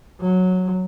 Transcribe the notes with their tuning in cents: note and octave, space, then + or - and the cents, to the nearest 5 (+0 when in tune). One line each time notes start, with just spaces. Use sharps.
F#3 -10